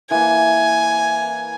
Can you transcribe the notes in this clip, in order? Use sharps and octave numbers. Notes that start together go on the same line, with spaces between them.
E3 A#3 G#5